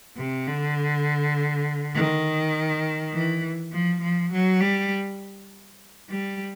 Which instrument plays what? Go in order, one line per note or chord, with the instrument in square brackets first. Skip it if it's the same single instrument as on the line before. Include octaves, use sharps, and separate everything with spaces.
[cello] C3
D3
D#3
E3
F3
F3
F#3
G3
G3